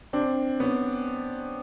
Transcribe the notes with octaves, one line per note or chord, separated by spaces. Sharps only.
C4 D4
B3 C#4